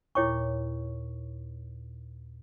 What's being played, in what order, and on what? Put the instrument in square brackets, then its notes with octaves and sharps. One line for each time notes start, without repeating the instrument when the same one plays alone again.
[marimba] D#2 A#2 [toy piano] E4 C#5 C#6